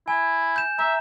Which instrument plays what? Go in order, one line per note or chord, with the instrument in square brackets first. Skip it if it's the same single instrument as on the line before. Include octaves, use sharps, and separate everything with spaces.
[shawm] E4 [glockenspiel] G#5
[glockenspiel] G6 E7
[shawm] E5 [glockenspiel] A#5 G6